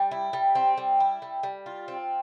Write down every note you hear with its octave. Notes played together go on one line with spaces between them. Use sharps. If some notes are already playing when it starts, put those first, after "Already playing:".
Already playing: G3
E4
G3
C4
G3
E4
G3
G3
F4
C4